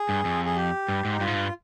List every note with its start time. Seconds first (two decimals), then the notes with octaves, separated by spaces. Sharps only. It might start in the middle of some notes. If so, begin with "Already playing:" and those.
Already playing: G#4
0.09 G2
0.25 F2
0.45 G#4
0.57 G4
0.88 G2
1.05 G#2 D#4
1.20 G2 F4
1.27 G#2
1.35 G2